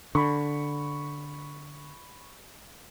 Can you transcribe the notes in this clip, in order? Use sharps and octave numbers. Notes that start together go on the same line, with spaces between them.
D3 B5 C#6